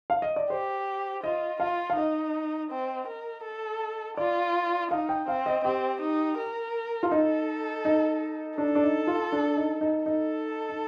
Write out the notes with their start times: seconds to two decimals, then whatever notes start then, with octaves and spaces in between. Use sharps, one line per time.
0.10 F5
0.22 D#5
0.36 D5
0.50 G4 C5
1.24 F4 D#5
1.60 F4 F5
1.90 F5
1.97 D#4 D#5
2.71 C4
3.07 A#4
3.44 A4
4.17 F4 D5
4.91 D#4 F5
5.09 G5
5.28 C4 F5
5.46 D#5
5.65 C4 G4
6.01 D#4
6.38 A#4
7.03 F4
7.11 D#4 A4
7.85 D#4
8.58 D4 A4
8.75 D4
8.83 D#4
9.07 F4
9.32 D4
9.57 D#4
9.81 D#4
10.05 D#4 A4
10.69 D#4